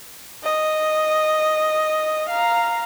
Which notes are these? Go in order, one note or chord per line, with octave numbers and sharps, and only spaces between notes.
D#5
F5 A#5